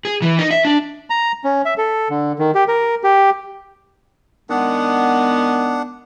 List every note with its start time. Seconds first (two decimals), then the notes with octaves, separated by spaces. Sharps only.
0.05 G#4
0.22 E3
0.39 D#4
0.51 E5
0.65 D4
1.10 A#5
1.44 C#4
1.65 E5
1.78 A4
2.10 D3
2.39 D#3
2.55 G4
2.68 A#4
3.04 G4
4.50 D#3 G#3 B3 D4 F#5